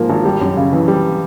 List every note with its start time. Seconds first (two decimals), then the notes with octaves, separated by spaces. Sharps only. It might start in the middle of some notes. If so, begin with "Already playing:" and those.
Already playing: G#2 F3 A#3
0.10 G#1
0.25 G3
0.41 F#2
0.57 C#3
0.73 E3
0.88 G3